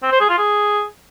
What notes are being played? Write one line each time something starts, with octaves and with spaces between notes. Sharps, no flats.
C4
C5
G#4
F4
G#4